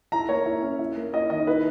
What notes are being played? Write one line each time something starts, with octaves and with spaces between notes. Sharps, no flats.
E4 A#5
A#3 C#5
E4
C#4
E4
A#3
E4 D#5
D#3 D#5
E4 B4